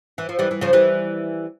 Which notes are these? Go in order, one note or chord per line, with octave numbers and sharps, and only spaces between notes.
E3
F3
E3 G3
E3
C#3 F3
E3 G3